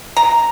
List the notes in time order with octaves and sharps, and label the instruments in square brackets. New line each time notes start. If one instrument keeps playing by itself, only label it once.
[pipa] A#5